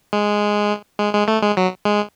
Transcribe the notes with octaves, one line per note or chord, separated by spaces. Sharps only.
G#3
G#3
G#3
A3
G#3
F#3
G#3